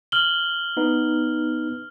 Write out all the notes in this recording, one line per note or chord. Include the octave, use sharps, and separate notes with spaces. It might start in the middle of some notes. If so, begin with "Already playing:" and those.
F6 F#7 G7
B3 D#4 B4